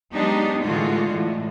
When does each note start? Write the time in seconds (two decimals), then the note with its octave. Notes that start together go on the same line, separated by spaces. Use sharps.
0.12 F#3 G#3 B3 D4 D#4 G4
0.63 A2 D3 E3 G#3 F4 F#4
1.13 A2